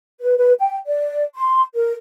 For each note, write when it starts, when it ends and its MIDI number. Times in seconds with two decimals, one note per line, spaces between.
0.21 0.35 71
0.38 0.52 71
0.59 0.76 79
0.86 1.23 74
1.34 1.62 84
1.75 1.93 70